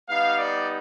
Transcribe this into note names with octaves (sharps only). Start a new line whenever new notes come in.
G3 B3 D#4 F5
D5